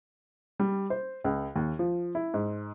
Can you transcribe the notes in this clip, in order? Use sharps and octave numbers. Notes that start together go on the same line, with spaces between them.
G3
C5
C#2
D#2
F3
E4
G#2